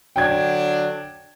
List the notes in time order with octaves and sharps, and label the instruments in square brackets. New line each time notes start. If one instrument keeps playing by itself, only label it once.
[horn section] D3 F#3 D4 [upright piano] G5 G#6